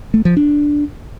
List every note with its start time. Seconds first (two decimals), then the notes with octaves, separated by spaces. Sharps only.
0.14 A3
0.25 F3
0.37 D4